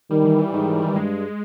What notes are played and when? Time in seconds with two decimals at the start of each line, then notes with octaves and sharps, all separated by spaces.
0.11 D#3 G3
0.25 E3
0.38 E3
0.53 G#2 D#3
0.82 G3
0.95 G2 G#3